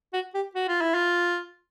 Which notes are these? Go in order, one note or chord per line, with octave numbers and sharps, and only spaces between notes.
F#4
G4
F#4
F4
E4
F4